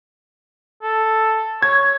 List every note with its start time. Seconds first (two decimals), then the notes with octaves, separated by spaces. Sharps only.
0.83 A4
1.63 C#5 G#6